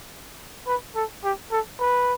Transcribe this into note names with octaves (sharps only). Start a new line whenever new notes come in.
B4
A4
G4
A4
B4